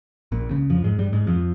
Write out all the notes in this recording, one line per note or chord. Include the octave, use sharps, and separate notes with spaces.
A#1 A#2
C#2 C#3
F2 F3
G#2 G#3
G2 G3
G#2 G#3
F2 F3